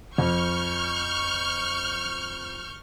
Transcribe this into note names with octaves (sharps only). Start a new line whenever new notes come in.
F2 C#6 F6 G6